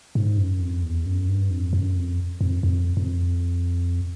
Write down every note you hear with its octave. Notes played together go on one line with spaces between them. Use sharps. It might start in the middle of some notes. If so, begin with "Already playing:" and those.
G#2
F#2
F2
E2
F#2
G2
F2
F#2
F2
F2
F2
F2